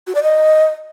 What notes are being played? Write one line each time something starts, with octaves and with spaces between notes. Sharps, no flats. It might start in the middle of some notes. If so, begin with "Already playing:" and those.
F#4
D5
D#5